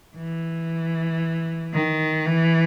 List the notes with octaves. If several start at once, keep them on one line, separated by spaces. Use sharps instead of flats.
E3
D#3
E3